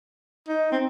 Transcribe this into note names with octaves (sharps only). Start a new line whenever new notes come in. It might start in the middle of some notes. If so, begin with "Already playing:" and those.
D#4
C4